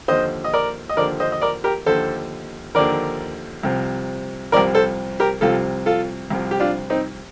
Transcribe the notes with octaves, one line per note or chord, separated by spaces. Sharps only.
D#2 D3 F3 C5 D#5
D#5
A#4 D5
D#5
D#2 D3 F3 A#4 D5
C5 D#5
D#5
A#4 D5
G4 A#4
D#2 D3 F3 A4 C5
D#2 D3 F3 A#4 D5
C2 C3 F3
C2 C3 F3 A#4 D5
A4 C5
G4 A#4
C2 C3 F3 F4 A4
F4 A4
C2 C3 F3
G4
D4 F4
C4 D#4